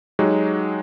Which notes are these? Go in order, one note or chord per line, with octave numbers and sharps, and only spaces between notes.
F#3 G#3 D#4 F#4 G4